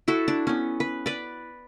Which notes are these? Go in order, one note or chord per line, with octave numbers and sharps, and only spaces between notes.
E4 F#4 A4
D4
B3 C#4
B4
B4 D5